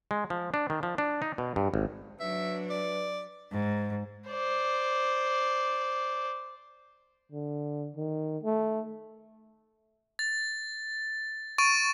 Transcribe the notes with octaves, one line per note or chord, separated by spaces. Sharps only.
G#3
F3
D4
D#3
F3
D4
D#4
B2
G2
G#1
F#3 D4 B4 E5
D5
G#2
C5 D5
D3
D#3
A3
A6
C#6 A6 D7 D#7